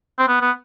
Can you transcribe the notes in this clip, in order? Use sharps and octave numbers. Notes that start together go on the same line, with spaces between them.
C4
B3
B3